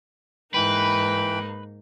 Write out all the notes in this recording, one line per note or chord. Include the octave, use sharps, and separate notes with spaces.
G#2 E3 A#3 D#4 B4 G5 B5